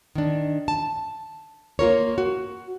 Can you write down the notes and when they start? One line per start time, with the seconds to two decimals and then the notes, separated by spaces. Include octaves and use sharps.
0.15 D#3 D4
0.68 A5
1.79 A#3 F4 A#4 C#5
2.18 F#4